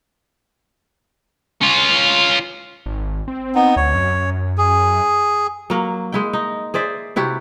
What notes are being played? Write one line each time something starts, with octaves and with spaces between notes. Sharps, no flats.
C#4 F4
G#1
C4
B3 D#4
D2 C#5
F#2
G#4
F#3 A#3
G#3 E4 G5
D#4
G#4 C5 D5 E5
C3 E4 F#4 G4